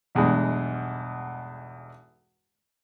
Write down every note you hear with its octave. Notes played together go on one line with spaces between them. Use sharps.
B1 E2 G2 G#3